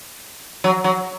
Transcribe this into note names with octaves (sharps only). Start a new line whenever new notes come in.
F#3
F#3